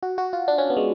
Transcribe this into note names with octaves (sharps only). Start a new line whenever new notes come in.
F#4
F#4
F4
D4
C#4
B3
G#3